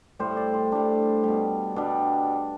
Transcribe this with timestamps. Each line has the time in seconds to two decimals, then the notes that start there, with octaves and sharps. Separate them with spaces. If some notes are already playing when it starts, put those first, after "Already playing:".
0.19 A2 G3 C5
0.37 D5
0.54 C5
0.72 A2 G3 D4
1.23 B2 G3
1.76 B2 G3 D4